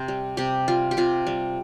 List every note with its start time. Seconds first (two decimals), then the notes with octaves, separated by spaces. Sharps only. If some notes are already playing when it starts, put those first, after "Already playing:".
Already playing: C3 C5
0.08 G3
0.37 C3 G4
0.68 G3 F4
0.91 G4
0.97 C3 F4
1.27 G3